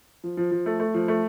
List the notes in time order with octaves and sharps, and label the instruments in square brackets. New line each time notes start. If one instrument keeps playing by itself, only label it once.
[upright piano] F3
F3
F3
A3
A3
F3
A3